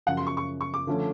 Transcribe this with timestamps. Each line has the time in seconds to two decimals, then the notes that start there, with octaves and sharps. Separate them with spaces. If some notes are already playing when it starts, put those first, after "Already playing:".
0.07 F#2 C#3 F3 F#5
0.17 C6
0.27 C#6
0.37 C#6
0.61 C#6
0.74 D6
0.87 D3 F3 A3 C#4